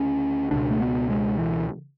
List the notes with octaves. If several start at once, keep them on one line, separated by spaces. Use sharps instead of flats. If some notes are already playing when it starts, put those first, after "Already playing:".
Already playing: D2 C#3 C#4
C#2 B2 D4
A3
B3
G#3
E3